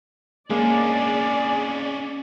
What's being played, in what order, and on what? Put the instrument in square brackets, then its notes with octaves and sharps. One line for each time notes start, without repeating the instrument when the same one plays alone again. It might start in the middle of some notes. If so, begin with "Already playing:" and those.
[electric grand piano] G#3 A#3 [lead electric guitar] C#4 D4 [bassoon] G#4 [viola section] D5